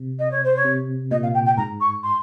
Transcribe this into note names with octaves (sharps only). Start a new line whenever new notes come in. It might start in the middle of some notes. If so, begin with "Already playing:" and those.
Already playing: C3
D#5
C#5
C5
C#5
C3
A#2 D#5
F5
G5
G5
G#2 A#5
C#6
C6